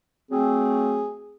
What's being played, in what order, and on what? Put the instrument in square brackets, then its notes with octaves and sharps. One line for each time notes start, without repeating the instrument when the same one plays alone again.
[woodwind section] F#3 A3 C4 [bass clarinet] G#4